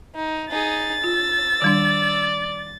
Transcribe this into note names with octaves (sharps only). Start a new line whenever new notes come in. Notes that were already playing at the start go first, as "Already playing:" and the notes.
D#4
D#4 G#4 A6
F4 E6
D#3 G3 D4 D5